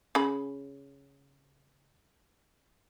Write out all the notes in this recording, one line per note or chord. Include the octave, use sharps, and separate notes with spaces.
C#3 B5